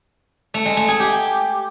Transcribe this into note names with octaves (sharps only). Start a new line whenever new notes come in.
A3
G#3
A3
G#4
G4